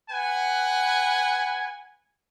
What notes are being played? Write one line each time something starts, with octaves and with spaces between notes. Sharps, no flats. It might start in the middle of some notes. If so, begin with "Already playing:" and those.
B4 F#5 G#5